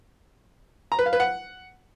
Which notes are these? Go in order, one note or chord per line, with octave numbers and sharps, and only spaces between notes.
A#5
B4
F5
B4
F#5